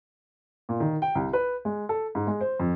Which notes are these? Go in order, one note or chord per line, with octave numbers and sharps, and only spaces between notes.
A#2
D#3
G5
C2
B4
G#3
A4
G#2
G#3
C5
F2